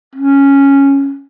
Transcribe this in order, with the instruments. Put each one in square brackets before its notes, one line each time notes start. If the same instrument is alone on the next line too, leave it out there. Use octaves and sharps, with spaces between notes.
[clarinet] C#4